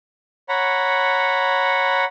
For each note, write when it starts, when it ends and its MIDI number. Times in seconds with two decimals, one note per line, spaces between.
0.49 2.05 73
0.49 2.05 78
0.49 2.05 82
0.49 2.05 83